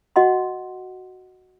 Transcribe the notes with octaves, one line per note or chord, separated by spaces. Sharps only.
F#4 D#5 F#5 C6